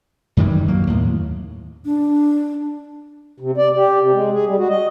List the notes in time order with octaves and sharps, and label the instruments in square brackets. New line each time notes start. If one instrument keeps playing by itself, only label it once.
[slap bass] F#2 D#3 E3 G3
F#2 F#3 A#3
D#2 A2
[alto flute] D4
[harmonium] C3
D5
G4
C3
G#3
G#4
G3
F#4
D#5